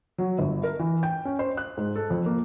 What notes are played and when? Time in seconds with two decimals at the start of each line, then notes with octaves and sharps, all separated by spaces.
0.18 F#3
0.39 G1
0.63 A#4
0.79 E3
1.03 G5
1.25 C#4
1.39 C5
1.57 F#6
1.77 G#2
1.96 A4
2.10 F2
2.26 A#3